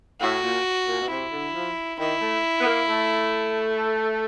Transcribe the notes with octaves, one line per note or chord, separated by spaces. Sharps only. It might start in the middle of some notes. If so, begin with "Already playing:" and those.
A2 F#4
A#2
A#2
B2
C3 E4
D3
F3
D#3 E4
A3
B3
A#3
A3